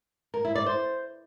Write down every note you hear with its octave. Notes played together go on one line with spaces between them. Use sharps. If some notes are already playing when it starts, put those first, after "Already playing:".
A#4
E4
D5
C5